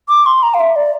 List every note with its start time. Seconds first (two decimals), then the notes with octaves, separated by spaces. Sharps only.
0.09 D6
0.26 C6
0.43 A#5
0.54 F5
0.60 E5
0.76 D5